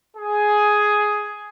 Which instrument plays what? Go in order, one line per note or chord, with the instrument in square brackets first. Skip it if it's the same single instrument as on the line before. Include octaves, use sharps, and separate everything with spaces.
[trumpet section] G#4